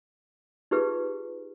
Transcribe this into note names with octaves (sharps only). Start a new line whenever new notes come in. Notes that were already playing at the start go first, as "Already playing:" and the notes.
D#4 F4 G4 G#4 B4